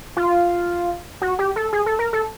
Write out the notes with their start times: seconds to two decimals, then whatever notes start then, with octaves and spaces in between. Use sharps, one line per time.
0.17 F4
1.22 F#4
1.39 G4
1.56 A4
1.73 G#4
1.86 A4
1.99 A#4
2.13 A4